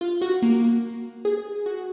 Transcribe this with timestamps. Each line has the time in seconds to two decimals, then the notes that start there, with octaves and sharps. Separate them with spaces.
0.01 F4
0.21 F#4
0.42 A#3
1.25 G#4
1.66 F#4